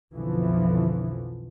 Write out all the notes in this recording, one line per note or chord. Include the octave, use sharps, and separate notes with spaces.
B1 F2 B2 D3 E3 F3